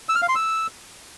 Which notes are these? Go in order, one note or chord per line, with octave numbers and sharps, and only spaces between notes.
E6
F6
F5
C6
E6